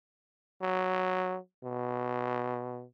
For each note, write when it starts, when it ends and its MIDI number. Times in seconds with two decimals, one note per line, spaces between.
0.62 1.38 54
1.64 2.84 47